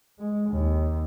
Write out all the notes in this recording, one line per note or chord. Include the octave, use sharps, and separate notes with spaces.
G#3
D#2